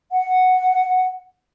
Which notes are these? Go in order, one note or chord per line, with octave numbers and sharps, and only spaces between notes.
F#5